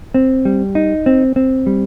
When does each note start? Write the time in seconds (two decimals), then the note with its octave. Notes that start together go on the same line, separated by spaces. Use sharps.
0.14 C4
0.45 G3
0.75 D#4
1.06 C4
1.36 C4
1.67 G3